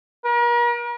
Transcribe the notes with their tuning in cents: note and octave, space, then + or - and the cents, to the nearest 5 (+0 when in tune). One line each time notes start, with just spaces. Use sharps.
A#4 +40